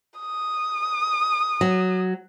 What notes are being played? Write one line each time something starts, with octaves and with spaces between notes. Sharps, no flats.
D#6
F#3